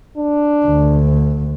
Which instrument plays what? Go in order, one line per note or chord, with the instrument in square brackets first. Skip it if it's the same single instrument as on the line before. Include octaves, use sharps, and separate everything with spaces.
[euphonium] D4
[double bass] D2